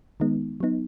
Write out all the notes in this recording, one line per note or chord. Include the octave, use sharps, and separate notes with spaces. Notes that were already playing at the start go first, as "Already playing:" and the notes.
D#3 G#3 B3 D#4
F#3 B3 D#4